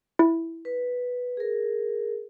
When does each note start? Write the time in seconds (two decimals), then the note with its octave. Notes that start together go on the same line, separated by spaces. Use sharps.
0.19 E4
0.65 B4
1.37 G#4 A#4